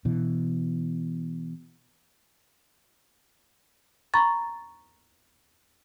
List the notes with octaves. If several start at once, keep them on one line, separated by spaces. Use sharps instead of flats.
B2 E3
A#5 B5 C#6 A6